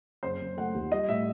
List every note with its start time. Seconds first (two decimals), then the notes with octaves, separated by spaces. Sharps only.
0.23 F#1 C5
0.41 F#1
0.57 A3 F#5
0.74 D#2
0.92 G3 D#5
1.09 A2 E5